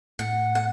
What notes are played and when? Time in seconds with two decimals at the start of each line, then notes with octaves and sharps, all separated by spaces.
0.19 A2 F#5
0.55 F#5